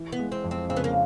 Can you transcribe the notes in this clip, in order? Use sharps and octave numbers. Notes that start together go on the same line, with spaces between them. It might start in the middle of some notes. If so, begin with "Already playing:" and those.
Already playing: E3
B3
G#3
C4
F2
C4
C#3 C4
B3
A#3